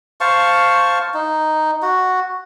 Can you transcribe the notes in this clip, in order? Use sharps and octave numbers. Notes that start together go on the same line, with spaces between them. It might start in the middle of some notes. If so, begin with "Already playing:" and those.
C5 F5 A5 C#6
D#4
F#4